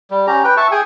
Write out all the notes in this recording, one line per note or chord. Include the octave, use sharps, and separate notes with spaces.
G3
C#4 G4 A#5
B4 G5
E5 A5 C#6
G#4 G5 G#5